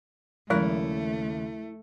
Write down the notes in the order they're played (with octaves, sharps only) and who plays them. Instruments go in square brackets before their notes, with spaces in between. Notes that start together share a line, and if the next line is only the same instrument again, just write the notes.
[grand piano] D#2 C#3 [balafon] F3 G#3 [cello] A3 [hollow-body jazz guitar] E4 A#4 D5